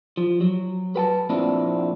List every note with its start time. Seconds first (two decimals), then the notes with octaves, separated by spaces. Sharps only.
0.17 F3
0.41 F#3
0.96 B4 G5 A5
1.30 F2 A#2 C4 D4 E4